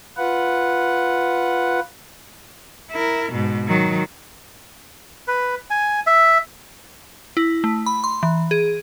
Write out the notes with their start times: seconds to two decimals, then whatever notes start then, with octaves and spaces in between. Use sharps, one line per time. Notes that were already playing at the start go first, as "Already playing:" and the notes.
0.17 F4 B4 F#5
2.92 E4 A#4
3.33 G#2 B2
3.68 D#3 F#3
5.28 B4
5.70 G#5
6.07 E5
7.37 E4
7.64 A3
7.86 B5
8.04 C6
8.23 E3
8.51 G#4